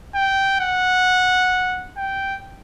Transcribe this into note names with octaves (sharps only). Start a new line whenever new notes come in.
G5
F#5
G5